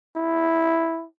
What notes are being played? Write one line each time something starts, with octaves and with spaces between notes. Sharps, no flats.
E4